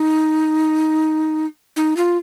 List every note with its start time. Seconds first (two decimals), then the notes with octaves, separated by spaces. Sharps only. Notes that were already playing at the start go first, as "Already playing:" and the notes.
Already playing: D#4
1.76 D#4
1.97 F4